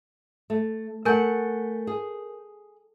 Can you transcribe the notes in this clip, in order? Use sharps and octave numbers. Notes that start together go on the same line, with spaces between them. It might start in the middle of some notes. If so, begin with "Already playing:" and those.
A3
A3 A#4 F#5 G#5 G6
G#4